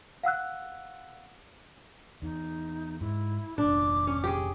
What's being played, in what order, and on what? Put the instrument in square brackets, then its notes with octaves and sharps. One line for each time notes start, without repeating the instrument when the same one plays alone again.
[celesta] F5 F#5 E6 F#6
[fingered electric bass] E2 [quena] D#4
[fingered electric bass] G#2 [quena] E4
[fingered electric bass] F1 A#2 [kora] D4 [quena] D6
[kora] C#4
G4 G#4